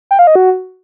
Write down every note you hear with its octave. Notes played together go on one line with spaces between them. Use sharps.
G5
F5
D#5
F#4